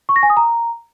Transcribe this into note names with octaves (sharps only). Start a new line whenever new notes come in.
C#6
A#6
G#5
D#6
A#5